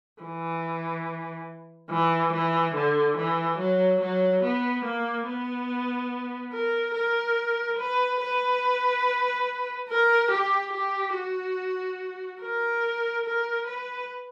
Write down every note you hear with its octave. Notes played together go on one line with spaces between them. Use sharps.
E3
E3
E3
D3
E3
F#3
F#3
B3
A#3
B3
A#4
A#4
B4
B4
A#4
G4
G4
F#4
A#4
A#4
B4